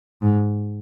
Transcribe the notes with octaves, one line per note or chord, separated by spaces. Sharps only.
G#2